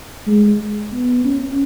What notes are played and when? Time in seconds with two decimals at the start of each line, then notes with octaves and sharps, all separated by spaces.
0.27 G#3
0.93 B3
1.25 C#4